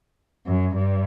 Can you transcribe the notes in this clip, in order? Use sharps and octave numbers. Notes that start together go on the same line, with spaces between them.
F#2
G2